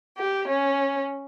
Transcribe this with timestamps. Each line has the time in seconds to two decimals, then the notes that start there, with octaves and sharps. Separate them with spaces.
0.16 G4
0.46 C#4